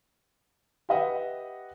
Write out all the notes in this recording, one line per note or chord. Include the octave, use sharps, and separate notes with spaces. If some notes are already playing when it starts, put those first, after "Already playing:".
G4 B4 D#5 E5 F#5